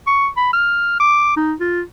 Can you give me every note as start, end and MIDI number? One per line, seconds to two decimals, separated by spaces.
0.07 0.28 85
0.37 0.53 83
0.53 0.98 89
1.00 1.34 86
1.36 1.53 63
1.60 1.81 65